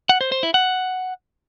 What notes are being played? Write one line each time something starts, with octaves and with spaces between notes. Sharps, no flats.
F#5
C5
C5
E4
F#5